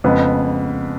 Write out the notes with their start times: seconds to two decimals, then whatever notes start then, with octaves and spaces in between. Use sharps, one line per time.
0.04 F2 C#3 G#3 B3